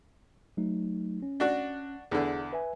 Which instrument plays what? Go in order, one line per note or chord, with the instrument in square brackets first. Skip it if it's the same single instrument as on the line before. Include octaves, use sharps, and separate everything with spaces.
[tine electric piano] F#3 A3 D#4
C#4
[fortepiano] D4 F#4
[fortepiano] E2 D3 [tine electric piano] G#4
[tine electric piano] B4 E5 G#5